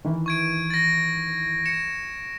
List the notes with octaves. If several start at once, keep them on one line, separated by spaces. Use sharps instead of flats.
D#3 E3
C#6 G#6 D7
A6 A#6
C#7 E7